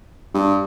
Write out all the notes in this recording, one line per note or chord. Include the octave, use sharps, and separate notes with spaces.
G2